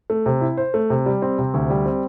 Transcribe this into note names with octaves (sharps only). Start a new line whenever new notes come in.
A3
C3
E4
C5
A3
C3
G3
C4
C3
D2
G3
C4